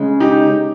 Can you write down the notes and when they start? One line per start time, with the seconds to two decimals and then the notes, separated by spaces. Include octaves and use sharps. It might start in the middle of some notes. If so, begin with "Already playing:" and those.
Already playing: C#3 G#3 C#4
0.20 D#4 G4